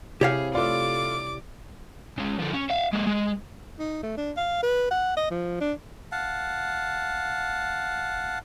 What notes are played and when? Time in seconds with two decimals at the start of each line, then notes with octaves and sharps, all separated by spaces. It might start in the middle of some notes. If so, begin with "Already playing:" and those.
0.21 C3 E4 G4 G#4 C#5 F5
0.55 A3 F4 D5 D6
2.18 C#3 G#3
2.39 D3 F3
2.54 C#4
2.70 E5 F5
2.93 G#3 A#3
3.07 G#3
3.79 D#4
4.03 A3
4.17 D4
4.37 F5
4.63 B4
4.91 F#5
5.17 D#5
5.31 F3
5.61 D4
6.12 F5 F#5 A5